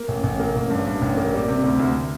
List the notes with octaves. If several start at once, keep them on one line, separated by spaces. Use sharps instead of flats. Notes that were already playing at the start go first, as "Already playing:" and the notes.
Already playing: A#3
A1
A1
A#3
A1
G2
G2
A1
A#3
G3
C3
D2
D2